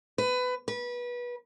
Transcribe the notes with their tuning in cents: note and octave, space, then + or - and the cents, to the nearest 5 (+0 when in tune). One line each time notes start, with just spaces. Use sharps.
B4 +20
B4 -25